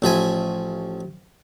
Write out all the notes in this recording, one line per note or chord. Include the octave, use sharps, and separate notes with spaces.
A1 F3 E5 G#5